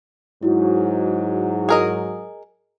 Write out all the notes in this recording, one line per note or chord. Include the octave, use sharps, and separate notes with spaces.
G#2 F#3 E4 F#4
G#4 A#4 D#5